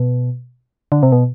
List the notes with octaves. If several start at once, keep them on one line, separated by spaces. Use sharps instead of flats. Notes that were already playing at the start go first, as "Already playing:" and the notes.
Already playing: B2
D3
C3
B2